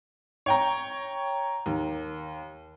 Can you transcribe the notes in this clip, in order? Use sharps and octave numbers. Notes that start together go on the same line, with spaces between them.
C#5 G5 A#5
D#2